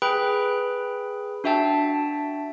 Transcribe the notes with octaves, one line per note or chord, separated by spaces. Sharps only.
G#4 B4 G5 B5 F#6
D4 F#4 E5 G5 A5